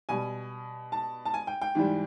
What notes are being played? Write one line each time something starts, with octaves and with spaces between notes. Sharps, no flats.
B2 G3 G#5
A5
A5
G#5
G5
G5
G#2 E3 G3